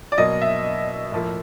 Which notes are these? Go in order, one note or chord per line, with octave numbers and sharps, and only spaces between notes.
D5
B2 F#3 A#3 D#5
E5
A2 F3 A#3